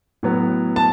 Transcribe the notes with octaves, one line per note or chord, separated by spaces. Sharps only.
A2 F#3 B3
A5